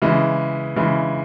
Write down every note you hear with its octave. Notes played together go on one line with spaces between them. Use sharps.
C#3 E3 G#3
C#3 E3 G#3